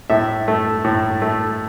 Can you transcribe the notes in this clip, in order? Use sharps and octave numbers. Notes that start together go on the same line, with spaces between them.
A2 E5
A3
A2
A3